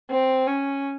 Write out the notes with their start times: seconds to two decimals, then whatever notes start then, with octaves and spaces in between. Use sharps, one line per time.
0.10 C4
0.47 C#4